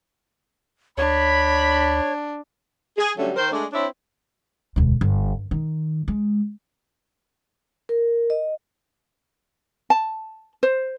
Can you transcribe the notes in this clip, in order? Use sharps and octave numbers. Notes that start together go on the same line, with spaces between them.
D2 D4 C#5 B5
G#4
D3 F#3 G3 A3 C#4
D#3 A#4 C5
G#3 A3 D4
C4 D4 E4 C#5
E1 D2
G1
D#3
G#3
A#4
D#5
A5
C5